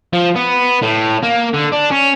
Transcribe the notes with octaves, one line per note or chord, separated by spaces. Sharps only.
F3
B3
A2
A#3
D3
D4
C#4